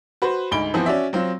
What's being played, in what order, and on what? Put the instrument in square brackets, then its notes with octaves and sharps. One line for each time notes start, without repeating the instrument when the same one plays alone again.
[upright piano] F#4 B4 C5
D2 G#2 B5 D7 G7
E3 F3 B3 C4
C#4 F#4 D5 E5
F#3 C4 F4